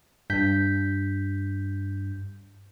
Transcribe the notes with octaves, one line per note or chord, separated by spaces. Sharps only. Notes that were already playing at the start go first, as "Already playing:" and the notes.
G2 G6 B6